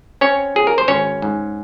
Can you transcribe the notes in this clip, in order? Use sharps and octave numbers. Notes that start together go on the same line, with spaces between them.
C4 C#4 C#5
F3 G#4
A#4
C5
G#1 C#4 C#5
G#2